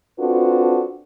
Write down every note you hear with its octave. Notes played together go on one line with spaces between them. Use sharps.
C4 D4 F4 F#4 A4 B4